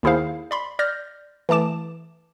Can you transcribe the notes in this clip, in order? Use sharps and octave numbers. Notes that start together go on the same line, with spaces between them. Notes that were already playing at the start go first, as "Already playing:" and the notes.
D#2 D#3 E4 G#4 C5 F5
D5 B5 C6
D5 F6 G6 A#6
E3 A3 A5 D6 E7